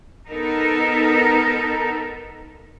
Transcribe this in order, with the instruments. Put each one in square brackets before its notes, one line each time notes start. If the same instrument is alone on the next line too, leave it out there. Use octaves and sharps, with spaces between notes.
[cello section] B3 D#4 A4 A#4